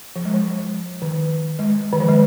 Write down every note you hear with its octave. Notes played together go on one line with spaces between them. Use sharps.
F3
G#3
F3
D#3
G#3
D#3
F3
G#3